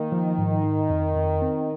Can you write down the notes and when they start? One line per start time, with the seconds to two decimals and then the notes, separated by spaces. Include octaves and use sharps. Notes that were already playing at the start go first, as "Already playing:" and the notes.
Already playing: D#3 A#3
0.12 F3
0.38 G#2
0.64 D#4
0.90 F2
1.16 F2
1.42 C4